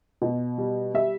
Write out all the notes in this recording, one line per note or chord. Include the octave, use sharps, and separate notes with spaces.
B2
G3
G3 E5